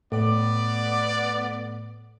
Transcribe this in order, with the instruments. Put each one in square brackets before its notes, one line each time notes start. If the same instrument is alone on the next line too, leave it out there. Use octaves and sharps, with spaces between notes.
[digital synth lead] A2 [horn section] B3 D5